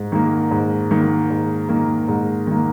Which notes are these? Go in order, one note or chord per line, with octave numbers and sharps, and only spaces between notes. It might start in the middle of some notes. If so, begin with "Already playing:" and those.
Already playing: G#2
D#3 A#3
G#2
D#3 A#3
G#2
D#3 A#3
G#2
D#3 A#3